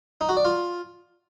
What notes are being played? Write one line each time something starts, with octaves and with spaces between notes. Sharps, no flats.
D#4
F#4
D5
F4